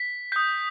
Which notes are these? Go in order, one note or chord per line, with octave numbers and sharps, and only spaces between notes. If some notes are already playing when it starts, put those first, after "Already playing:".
Already playing: B6
D#6 G6 B6